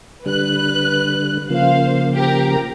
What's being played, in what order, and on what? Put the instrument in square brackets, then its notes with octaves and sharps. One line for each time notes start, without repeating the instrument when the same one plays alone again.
[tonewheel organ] D3 G3 [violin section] B4 F#6
[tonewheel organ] C#3 F3 A#3 [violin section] C5 F5
[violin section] G4 A#4 A#5